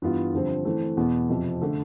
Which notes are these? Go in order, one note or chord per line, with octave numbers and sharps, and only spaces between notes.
G2 E3 B3 F4
G2 D3 F3 C4
E3 A3 C4
E2 B2 B3
F2 C3 F3
D3 A3